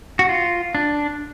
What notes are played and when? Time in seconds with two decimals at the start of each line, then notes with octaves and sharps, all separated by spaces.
0.19 F#4
0.29 F4
0.75 D4